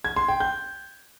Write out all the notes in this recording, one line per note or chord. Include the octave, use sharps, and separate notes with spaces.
G#6
C6
G5
G6